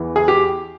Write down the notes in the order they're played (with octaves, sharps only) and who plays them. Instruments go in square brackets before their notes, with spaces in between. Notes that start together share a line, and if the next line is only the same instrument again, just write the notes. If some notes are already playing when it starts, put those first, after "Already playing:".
Already playing: [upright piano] E2 E3
G#4
G4